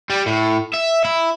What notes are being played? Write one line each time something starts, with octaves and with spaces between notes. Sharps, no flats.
G3
A2
E5
E4